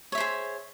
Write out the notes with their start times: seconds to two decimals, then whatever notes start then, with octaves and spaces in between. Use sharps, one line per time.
0.12 C#5
0.15 E5
0.18 C5
0.20 G#4